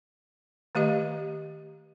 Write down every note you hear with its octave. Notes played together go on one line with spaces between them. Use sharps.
D#3 A3 G4 D#5